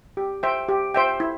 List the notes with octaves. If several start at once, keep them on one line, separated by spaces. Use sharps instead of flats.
G4
C5 E5 G5
G4
C5 E5 G5
E4